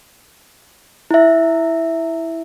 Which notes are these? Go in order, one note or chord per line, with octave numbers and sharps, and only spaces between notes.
E4 E5